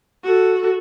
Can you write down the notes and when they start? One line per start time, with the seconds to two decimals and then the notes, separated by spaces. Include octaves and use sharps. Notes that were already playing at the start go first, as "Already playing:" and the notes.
0.24 F#4 A4